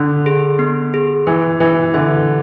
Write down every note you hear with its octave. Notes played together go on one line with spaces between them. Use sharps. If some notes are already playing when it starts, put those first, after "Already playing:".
Already playing: D3 D4
G#4
B3
G#4
E3 B4
E3 B4
D3 E5